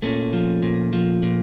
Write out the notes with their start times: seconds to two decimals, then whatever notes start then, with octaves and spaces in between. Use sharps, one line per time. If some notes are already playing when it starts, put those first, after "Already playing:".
0.02 A#2 A3 C#4
0.33 F3
0.62 A#2
0.93 F3
1.22 A#2